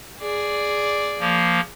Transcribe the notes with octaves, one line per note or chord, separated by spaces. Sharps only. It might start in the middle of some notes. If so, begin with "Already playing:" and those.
G#4 D5
F3 A#3